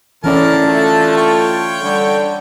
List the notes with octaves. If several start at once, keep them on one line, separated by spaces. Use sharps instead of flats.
A2 D3 E3 C#4 A#4 D5 A5
A3 F4
C#5 G5
D3 G3